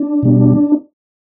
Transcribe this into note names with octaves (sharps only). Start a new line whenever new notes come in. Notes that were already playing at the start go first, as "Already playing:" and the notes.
Already playing: D4
B2 G3